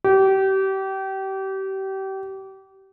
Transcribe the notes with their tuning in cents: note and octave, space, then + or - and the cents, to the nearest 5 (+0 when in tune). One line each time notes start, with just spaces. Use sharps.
G4 -30